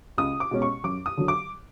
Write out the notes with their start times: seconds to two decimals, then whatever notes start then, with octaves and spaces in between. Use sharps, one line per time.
0.18 C#2 D#6
0.40 D6
0.51 B2 G#3 C#4
0.62 C#6
0.84 F#2 D6
1.06 D#6
1.17 D3 F#3
1.28 D6